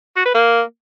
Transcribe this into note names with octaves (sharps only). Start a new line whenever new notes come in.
F#4
B4
A#3